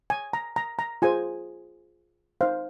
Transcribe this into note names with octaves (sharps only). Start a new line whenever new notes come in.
G#5
A#5
A#5
A#5
F4 G#4 C5 G#5
D#4 C5 F5